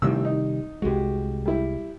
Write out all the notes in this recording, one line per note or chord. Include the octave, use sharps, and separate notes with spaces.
A1 C3 D#3 G3 E6
D#4
C2 G#3 F#4 G4
G3 E4